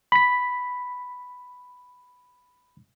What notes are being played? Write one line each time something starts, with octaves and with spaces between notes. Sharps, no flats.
B5 B6